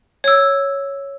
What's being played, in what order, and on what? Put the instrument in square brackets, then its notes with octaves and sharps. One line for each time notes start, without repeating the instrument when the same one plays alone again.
[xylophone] C#5 E6